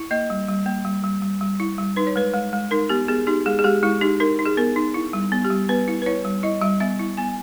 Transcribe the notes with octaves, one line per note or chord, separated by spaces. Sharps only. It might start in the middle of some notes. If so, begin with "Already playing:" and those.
Already playing: E4
A#3 D#5
G3
G3
A#3
G3
G3
G3
G3
E4
G3
D#4 B4
C#5
G#3 B4
G#3
G#3
D#4 A#4
B3 G4
B3 G#4
D#4 G4
G#3 G#4
G#4
G#3 G4
G#3 E4
D#4 G4
D#4 A#4
D#4
G#4
B3 A#4
D#4
E4
G3
B3
G4
G3
B3 B4
E4
B4
E4 C#5
G3
E4 D#5
G3 E5
B3 E5
E4
B3 G#5